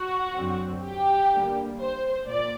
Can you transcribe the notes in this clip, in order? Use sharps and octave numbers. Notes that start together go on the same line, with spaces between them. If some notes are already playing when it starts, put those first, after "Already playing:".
Already playing: F#4
F#2 D3 F#3 C4
G4
D3 G3 A#3
C5
A#2 D5